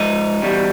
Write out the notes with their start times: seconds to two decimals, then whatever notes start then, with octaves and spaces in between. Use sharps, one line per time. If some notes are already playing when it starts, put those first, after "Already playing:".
Already playing: G#2 F3 D#4
0.42 E2 B2 G3